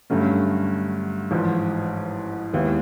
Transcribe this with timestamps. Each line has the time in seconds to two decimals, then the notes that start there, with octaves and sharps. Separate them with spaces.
0.10 G2 D3 F#3 A3 C#4
1.31 A1 G#2 F3
2.53 D#2 D#3 G#3 B3 E4